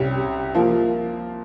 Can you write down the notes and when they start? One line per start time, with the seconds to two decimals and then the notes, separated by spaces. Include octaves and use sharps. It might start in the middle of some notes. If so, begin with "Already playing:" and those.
Already playing: C2 C3 G3 C#4 G4
0.54 F3 A#3 F4